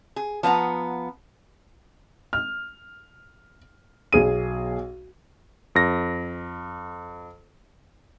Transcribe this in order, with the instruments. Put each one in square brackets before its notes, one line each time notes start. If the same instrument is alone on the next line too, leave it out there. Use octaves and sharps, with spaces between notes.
[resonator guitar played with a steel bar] G#4
F3 B3 F#5 A#5
[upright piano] F6
B1 G#4 D#7
[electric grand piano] F2 A#6